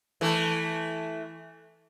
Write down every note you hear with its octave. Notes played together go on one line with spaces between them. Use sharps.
E3 A3